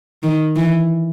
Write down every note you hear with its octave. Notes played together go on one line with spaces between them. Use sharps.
D#3
E3